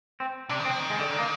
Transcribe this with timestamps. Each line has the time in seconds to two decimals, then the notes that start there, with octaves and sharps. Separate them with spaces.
0.20 C4
0.49 C3 D4
0.60 D#3
0.65 C4
0.70 F3
0.80 D#3
0.90 G#3
0.99 D3
1.10 D3
1.19 A#3